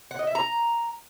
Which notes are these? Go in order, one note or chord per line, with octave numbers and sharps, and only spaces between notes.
F#5
D#5
E5
A#5